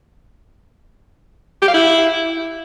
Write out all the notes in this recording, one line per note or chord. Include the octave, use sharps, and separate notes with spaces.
G4
F5
E4